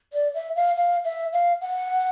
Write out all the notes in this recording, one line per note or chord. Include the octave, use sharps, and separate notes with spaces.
D5
E5
F5
F5
E5
F5
F#5